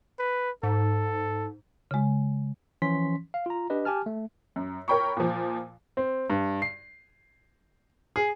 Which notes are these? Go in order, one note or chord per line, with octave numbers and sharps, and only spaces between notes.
B4
G#2 A4
C#3 G#3
E3 F3 C#4 C6 B6
F5
F4 A#5
D4 G4 B4 D#5
G4 G#5 A5 F6
A3
F#2
A#4 C#5 G5 B5 C#6
A#2 F3
C4
G2
C7
G#4